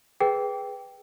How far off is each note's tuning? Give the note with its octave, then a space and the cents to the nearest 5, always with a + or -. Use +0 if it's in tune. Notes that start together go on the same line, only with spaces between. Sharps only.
G#4 +0 B4 +0 G5 +0